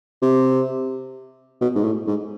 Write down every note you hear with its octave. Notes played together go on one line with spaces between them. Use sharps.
C3
B2
G#2
A2
G#2